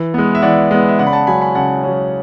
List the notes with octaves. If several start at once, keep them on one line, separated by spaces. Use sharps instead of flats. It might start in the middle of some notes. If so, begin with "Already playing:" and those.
Already playing: E3
G#3 B3
E5
E3 D5 F#5
G#3 B3
E5
C#3 D5 F#5
B5
F#5 A5
F#3 C#4 G#5 B5
G#5 B5
C#3 F#5 A5
F#3 C#4